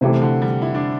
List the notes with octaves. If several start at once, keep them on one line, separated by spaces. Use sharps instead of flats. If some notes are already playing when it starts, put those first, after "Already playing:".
C3 E3 A3 E4 G4
D3
G3
E4
D4